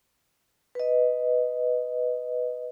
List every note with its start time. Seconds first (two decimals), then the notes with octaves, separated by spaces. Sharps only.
0.75 B4 D#5